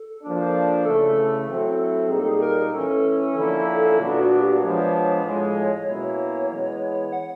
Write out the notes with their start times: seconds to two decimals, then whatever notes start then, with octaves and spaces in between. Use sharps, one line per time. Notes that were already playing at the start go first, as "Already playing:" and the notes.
Already playing: A4
0.22 F3 A#3 D4
0.85 C#3 E3 A3 A4
1.48 F#3 A3 C4 E4
2.10 A#2 G3 A#3 D#4 G#4
2.19 A4
2.28 G#4
2.42 A#4
2.73 E3 A3 C#4 A4
3.36 D3 F3 A#3 C#4 E4
3.98 A#2 F#3 B3 D4 F4
4.20 F#4
4.40 G4
4.61 F3 G#3 B3 D4 C#5
5.24 A2 F3 G#3
5.87 B2 F#3 A#3 C#4 E4
6.49 E3 G#3 B3
7.13 F#5